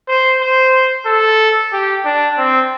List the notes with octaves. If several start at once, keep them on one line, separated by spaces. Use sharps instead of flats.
C5
C5
A4
G4
D4
C4